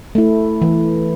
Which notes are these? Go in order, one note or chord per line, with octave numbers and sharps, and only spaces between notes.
A3 E4
E3